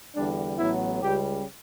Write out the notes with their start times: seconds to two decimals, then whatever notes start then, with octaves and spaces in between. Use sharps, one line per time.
0.15 E2 D3 G3 D4
0.58 A1 A2 F#3 B3 E4
1.01 C#2 C#3 G3 G4